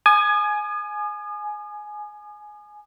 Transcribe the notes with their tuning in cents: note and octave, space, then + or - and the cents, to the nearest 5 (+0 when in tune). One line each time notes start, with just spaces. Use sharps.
G#5 +15 D#6 -40